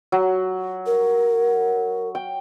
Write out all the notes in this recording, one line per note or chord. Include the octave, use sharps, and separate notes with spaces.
F#3
A#4
G5